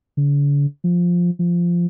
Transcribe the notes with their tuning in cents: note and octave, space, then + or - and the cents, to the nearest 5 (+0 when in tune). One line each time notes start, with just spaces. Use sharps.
D3 -45
F3 +5
F3 -10